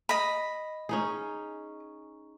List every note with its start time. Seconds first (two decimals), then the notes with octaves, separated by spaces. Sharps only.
0.09 D#5 B5
0.89 C#4 D#4 G#4